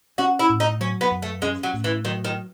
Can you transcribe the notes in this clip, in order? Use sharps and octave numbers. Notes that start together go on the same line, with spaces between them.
C#4 F#4
E4
A2
D#4
F#3 C#4
B3
F#2
A3
G#3 C#4
F#3
A2
E3
D#3 F#3
D#3